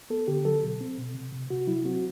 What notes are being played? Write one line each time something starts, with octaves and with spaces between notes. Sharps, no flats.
B3 A4
D3 G4
F#3 A4
B2
C4
B2
C3
C3
C3 F#4
F#3 E4
C4 F#4